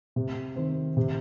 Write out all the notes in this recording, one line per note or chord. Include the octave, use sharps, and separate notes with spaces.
C3
D#3 C4
C3